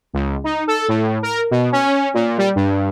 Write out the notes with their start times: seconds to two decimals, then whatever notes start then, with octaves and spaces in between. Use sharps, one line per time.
0.13 C#2
0.44 D#4
0.67 A4
0.88 A2
1.23 A#4
1.51 B2
1.72 C#4
2.14 A#2
2.38 G3
2.56 G2